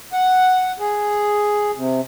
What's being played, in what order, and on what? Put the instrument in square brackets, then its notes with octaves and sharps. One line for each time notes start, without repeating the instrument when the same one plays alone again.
[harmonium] F#5
G#4
C3